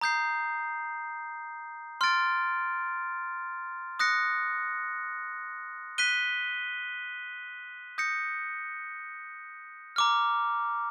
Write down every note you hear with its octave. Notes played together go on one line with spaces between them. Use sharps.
A#5 D#6 G6 C7
C6 F6 A6 D7
D#6 F#6 A#6 C#7
F#6 B6 D#7 G7
D#6 G6 A#6 C#7
A#5 D6 F6